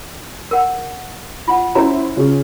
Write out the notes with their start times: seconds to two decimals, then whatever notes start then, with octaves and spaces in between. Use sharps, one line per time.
0.51 A#4 F#5
1.48 F4 F#5
1.75 C#4 E4 C5 A#5
2.16 C#3 C#4 F4